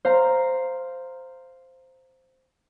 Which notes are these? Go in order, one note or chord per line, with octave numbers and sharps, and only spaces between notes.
C5 F5 A#5